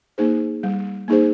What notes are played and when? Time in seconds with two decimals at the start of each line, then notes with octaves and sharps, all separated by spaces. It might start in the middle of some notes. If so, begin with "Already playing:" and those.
0.18 A#3 D#4 G#4 C5
0.63 G3
1.08 A#3 D#4 G#4 C5